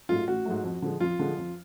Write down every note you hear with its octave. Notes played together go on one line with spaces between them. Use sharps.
G#2 F#3 A3 F4
A1 F#4
G#2 F#3 A3
F2
D3 F3 G#3
F2 F4
D3 F3 G#3
F2